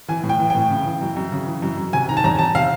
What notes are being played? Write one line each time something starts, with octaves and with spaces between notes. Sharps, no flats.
E3 G#5
A2
G5
E3
A2 G5
C#3
E3
F#2
F#2
C#3
E3
F#2
F#2
C3 G#5
D#3 A#5
A5
E2 A#5
E2 A5
C3 F5